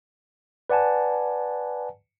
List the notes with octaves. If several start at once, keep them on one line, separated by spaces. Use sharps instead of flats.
B4 D5 F#5 G#5 A5